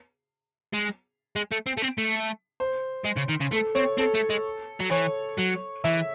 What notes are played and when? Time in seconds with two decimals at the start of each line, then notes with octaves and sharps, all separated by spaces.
0.74 G#3
1.36 G#3
1.51 A3
1.66 C4
1.77 A3
1.82 C4
1.98 A3
2.60 C5
3.05 G#3
3.17 C#3
3.29 D#3
3.41 C#3
3.52 A3 A4
3.75 C4 C#5
3.98 C4 A4
4.15 A3
4.30 G#3
4.80 F#3
4.91 E3 C#5
5.38 F#3
5.84 E3 E5